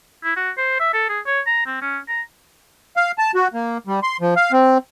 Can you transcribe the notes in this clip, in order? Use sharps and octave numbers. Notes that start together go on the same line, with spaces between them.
E4
F#4
C5
E5
A4
G#4
C#5
A#5
C4
C#4
A#5
F5
A5
F#4
A#3
G3
C6
F3
F5
C4